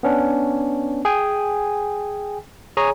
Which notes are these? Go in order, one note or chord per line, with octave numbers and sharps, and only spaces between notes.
B3 C#4 D4
G#4 G5 G#5
G#4 C#5 G#5 A#5